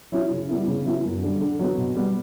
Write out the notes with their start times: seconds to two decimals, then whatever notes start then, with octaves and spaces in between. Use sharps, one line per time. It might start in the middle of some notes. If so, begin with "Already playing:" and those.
0.12 F#3 C#4 E4
0.31 C#3
0.49 G3 B3 E4
0.67 C#3
0.85 F#3 B3 E4
1.03 F#2
1.22 D3 G3
1.41 D3
1.59 F#3 B3
1.77 B2
1.95 G3 B3